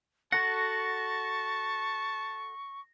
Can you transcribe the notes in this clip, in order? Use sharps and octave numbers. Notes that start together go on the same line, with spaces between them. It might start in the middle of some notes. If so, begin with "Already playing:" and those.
F#4 A4 F#5 A5 C#6 A#6